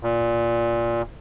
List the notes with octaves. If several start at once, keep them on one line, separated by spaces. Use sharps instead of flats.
A#2